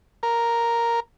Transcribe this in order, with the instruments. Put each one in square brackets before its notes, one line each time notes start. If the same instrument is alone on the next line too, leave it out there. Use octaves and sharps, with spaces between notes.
[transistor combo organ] A#4